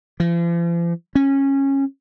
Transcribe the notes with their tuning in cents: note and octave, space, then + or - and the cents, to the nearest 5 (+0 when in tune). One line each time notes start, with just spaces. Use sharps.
F3 -45
C#4 -15